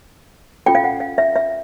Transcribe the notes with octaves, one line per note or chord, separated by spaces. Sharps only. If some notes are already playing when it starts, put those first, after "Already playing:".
C#4 F4 A4 G5
F5
F#5
F5
E5
E5